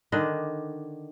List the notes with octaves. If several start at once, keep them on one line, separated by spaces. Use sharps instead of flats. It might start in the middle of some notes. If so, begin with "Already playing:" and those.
D3 D#3 D4 D#5